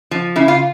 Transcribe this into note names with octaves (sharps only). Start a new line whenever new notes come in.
F3
C#3 E4
F4